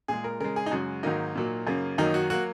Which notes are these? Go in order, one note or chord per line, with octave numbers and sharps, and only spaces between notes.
A#2 G#3 G#4
A#4
C#3 G#3 A#4
G#4
D#4
F#2 C#3 G#3 F#4
G#2 D#3 F#3 A#3 D#4
A#2 F#3 A#3
F#2 C#3 A#3
F#2 D#3 F#3 A#3 D#4
F#4
F#3 A#3 F#4